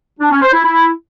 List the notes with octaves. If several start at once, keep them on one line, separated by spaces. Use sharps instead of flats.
D4
C#4
C5
E4
E4